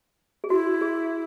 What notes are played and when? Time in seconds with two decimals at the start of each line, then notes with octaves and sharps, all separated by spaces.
0.44 G#4
0.50 E4 F#4
0.81 G#4